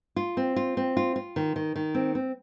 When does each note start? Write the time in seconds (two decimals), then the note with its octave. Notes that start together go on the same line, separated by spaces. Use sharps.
0.16 F4
0.37 C4
0.56 F4
0.77 C4
0.97 F4
1.16 F4
1.36 D#3
1.56 D#3
1.76 D#3
1.95 C4
2.15 C4